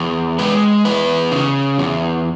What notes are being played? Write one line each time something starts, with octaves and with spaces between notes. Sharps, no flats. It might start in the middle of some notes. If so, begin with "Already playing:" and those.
Already playing: E2
G#3 B4
E2 B4
C#3
E2